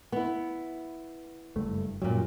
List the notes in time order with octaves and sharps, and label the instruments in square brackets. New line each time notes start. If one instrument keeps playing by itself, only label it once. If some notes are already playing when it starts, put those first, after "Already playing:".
[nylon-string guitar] B3 E4
[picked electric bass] F#1 G2 A3
[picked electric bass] F#2 F#3 [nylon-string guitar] A#2 G3